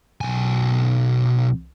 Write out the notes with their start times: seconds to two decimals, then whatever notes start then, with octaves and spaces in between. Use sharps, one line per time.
0.21 B1 G#5